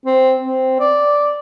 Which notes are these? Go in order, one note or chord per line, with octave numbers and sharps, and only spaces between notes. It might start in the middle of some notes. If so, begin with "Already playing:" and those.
C4
C4
D5